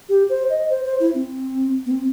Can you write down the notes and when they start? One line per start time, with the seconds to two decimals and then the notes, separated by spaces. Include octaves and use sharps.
0.09 G4
0.30 C5
0.50 D#5
0.70 C5
0.85 C5
1.00 E4
1.15 C4
1.86 B3
1.91 C4